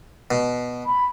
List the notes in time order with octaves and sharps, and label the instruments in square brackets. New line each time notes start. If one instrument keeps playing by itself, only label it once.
[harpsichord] B2
[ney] B5